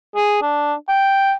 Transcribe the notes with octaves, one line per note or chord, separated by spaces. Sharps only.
G#4
D4
G5